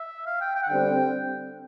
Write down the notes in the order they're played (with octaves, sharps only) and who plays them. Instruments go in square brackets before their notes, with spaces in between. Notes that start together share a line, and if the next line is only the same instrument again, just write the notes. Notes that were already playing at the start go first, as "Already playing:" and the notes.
Already playing: [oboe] E5
F5
G5
G5
F#5
[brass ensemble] D3 G3 C4 [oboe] G5